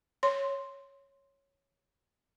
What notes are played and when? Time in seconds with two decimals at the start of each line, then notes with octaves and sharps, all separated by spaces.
0.23 C#5 C6